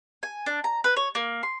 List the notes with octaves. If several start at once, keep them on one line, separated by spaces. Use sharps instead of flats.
G#5
D4
A#5
B4
C#5
A#3
C6